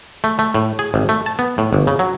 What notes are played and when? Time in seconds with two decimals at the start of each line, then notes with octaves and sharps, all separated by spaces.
0.24 A3
0.39 A3
0.54 A2
0.79 G#4
0.94 G#1
1.09 A3
1.26 A5
1.39 B3
1.58 A2
1.73 G1
1.87 C#3
1.99 F#3